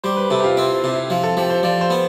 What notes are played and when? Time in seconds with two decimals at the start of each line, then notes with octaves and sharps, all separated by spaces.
0.04 G3 C5
0.17 B4
0.31 C3 A4
0.40 G4
0.44 F4
0.57 C4 E4
0.84 C3
0.93 E4
1.10 F3
1.23 A4
1.37 F3 G4
1.50 C5
1.63 F3 D5
1.81 C5
1.90 B3